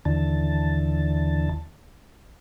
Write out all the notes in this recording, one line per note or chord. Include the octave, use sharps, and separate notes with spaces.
D#2 D3 E3 A5